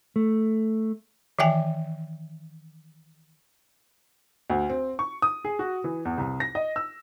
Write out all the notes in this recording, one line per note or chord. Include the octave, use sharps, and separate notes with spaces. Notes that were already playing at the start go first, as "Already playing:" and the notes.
A3
D#3 E3 E5 G5 G#5
D2
C4
C#6
D#6
G#4
F#4
E3
E2
C2
A#6
D#5
E6